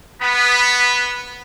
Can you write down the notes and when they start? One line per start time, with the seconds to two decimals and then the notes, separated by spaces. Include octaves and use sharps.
0.21 B3 B5